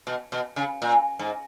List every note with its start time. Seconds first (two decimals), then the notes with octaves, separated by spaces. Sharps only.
0.07 B2
0.32 B2
0.56 C#3
0.82 A#2
1.19 G#2